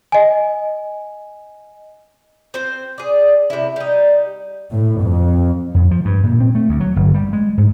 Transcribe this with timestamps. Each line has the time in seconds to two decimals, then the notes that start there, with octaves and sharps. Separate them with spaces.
0.12 D#5 G#5
2.54 C4 C5
2.98 G#4 D5
3.50 C3 E4
3.76 G3 D#4
4.71 A2
5.03 F2
5.75 F2
5.91 F3
6.05 G2
6.23 A#2
6.40 C4
6.55 A3
6.69 D2
6.80 F#3
6.96 G1
7.14 G3
7.33 G#3
7.58 G#2